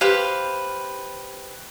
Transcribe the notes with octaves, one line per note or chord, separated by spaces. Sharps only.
G4 B4 C5 F5